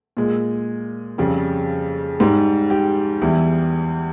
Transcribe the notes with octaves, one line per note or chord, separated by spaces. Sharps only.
A#2 G#3
F2 C#3 G3
G#2 G3
G4
E2 E3 G3